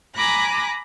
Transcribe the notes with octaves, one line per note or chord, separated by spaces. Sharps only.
G#5 A#5 B5 D6 F#6 A#6